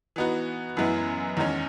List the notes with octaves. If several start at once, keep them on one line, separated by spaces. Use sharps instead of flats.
E3 B3 D#4 F#4
F#2 E3 G#3 B3 E4
E2 D#3 G#3 C#4